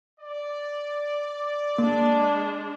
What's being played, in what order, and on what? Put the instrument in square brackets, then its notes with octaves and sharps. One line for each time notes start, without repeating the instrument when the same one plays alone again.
[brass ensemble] D5
[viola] G#3 D4 [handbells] A#3